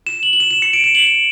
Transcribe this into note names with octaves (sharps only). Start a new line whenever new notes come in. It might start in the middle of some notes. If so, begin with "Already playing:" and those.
E7
F#7
F#7
E7
E7
C#7
D7
E7
F#7
F#7